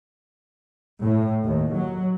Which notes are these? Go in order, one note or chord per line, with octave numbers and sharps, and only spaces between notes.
A2
D#2
F#3